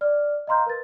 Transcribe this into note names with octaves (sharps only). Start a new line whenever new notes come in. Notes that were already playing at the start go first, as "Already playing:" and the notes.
D5 F6
D#5 F5 A#5 C6 F6 G6
A#4 B4 A6